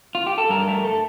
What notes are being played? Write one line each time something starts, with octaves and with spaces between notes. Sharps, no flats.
F4
G4
A4
G2 A#4
A3 A#4
A4